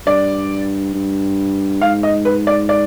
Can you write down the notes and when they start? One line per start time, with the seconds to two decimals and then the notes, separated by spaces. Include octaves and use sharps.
0.06 G2 D5
0.95 G2
1.81 G#2 F5
2.03 D#5
2.25 B4
2.47 D5
2.69 D5